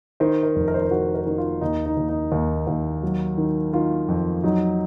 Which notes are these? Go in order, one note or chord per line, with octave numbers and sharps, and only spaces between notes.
D#3 C5
A#4
F1
A#4
C5
A#4
D#3 F#4
A#4
D#3
F4
D#2 D#4
D#4
D#2
D#4
D#2
D#2
F#3
D#3
D#3 F4
F2
F#3 D#4